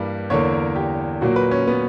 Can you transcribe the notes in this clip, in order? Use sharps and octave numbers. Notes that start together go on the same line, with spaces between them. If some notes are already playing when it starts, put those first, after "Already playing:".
Already playing: G2 E3 G3 A#3
E2 D3 A#3 C#5
A#4
G4
A#2 F#3 A#3 F#4
B4
C#4
B3